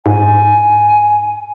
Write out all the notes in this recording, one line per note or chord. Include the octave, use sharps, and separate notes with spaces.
G#2 G#5